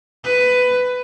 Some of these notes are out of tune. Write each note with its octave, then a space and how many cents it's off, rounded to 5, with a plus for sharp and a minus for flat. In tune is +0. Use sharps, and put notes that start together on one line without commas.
B4 +15